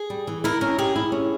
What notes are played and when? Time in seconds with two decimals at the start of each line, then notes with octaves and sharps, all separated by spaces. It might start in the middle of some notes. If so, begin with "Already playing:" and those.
Already playing: G#4
0.10 G3
0.27 E3
0.44 E4 A#4
0.61 C#4 A#4
0.78 G4 G#4
0.96 E4
1.12 C#4